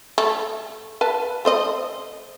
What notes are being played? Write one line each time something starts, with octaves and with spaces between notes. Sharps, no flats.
A3
B4 E5 A5
A3 C5 D#5